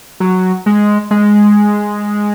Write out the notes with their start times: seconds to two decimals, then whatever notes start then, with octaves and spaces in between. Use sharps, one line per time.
0.20 F#3
0.66 G#3
1.11 G#3